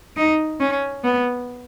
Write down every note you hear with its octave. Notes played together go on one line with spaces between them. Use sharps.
D#4
C#4
B3